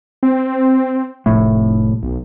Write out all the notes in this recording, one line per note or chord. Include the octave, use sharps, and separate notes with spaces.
C4
F1 A2
B1